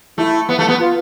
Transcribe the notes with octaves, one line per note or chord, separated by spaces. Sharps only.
A3 E4
B3
A3
B3
F4